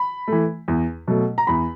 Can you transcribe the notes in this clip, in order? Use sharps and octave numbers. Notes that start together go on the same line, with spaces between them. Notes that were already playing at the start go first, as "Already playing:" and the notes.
Already playing: B5
E3 A3
E2
B2 F#3 A3
A#5
E2 B5